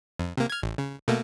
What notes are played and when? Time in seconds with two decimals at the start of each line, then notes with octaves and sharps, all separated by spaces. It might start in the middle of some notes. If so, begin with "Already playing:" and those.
0.19 F2
0.37 C3 A#3
0.50 F6 G#6
0.63 A1
0.78 C#3
1.08 B2 A3 A#3